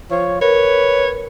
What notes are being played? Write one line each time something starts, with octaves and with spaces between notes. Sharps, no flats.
F3 C#5
A#4 B4 C#5